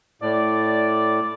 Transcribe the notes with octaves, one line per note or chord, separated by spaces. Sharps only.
A2 D5